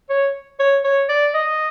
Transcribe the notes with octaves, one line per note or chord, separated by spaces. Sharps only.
C#5
C#5
C#5
D5
D#5